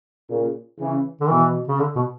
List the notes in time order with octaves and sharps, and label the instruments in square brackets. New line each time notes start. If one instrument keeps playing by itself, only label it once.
[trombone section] A#2 C#3
C#3 E3
[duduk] D3
[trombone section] B2 [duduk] E3
[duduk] C#3
D3
B2